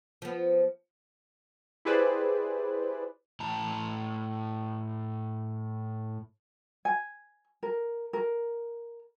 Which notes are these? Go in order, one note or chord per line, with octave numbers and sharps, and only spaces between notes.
F3 B3
E4 G4 G#4 B4 C5 D5
A2 A5 A#5
G#5
A#4
A#4